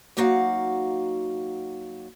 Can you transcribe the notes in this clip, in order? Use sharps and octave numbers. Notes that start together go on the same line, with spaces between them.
F#2 A#3 D#4 F#4 F5 F#5